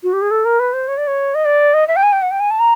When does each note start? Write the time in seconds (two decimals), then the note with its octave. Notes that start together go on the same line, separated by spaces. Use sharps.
0.03 F#4
0.13 G4
0.21 G#4
0.31 A4
0.45 A#4
0.59 B4
0.73 C5
0.88 C#5
0.97 D5
1.07 C#5
1.35 D#5
1.45 D5
1.74 D#5
1.88 E5
1.96 G5
2.03 G#5
2.12 G5
2.22 F#5
2.31 G5
2.40 G#5
2.50 A5
2.59 A#5